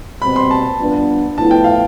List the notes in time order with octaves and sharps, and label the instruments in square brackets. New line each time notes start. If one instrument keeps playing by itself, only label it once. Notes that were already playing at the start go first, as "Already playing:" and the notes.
[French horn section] B2 G3 C4 [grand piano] B5
[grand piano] C6
A5
[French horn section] G2 F3 B3 D4
[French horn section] A2 F3 B3 E4 [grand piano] A5
[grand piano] G5
F5